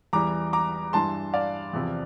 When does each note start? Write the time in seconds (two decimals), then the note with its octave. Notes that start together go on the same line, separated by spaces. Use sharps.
0.13 E2 E3 G3 A#5 D6
0.53 A#5 D6
0.93 G2 E3 G3 A5 C6
1.34 D5 F5
1.73 E2 C3 F3